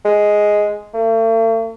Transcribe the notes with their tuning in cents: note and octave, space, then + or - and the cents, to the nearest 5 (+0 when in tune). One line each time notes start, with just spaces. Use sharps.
G#3 +5
A3 +45